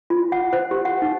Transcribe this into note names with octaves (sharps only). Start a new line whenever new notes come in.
F4
F#5
C5
G4
F#5
D#4